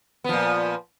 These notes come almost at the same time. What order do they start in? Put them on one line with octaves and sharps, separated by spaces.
B3 F3 A#2